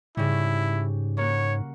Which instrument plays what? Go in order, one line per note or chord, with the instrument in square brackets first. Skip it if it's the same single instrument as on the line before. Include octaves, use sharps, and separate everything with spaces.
[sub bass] G#2 [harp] C#3 G3 [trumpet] E4
[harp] A#3 F#4 [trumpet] C#5